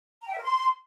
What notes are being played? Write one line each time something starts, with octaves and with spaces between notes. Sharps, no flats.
A#5
G5
E5
A#4
C6